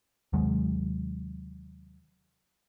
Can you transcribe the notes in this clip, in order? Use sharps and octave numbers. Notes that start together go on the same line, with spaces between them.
D#2 C3 F#3 G#3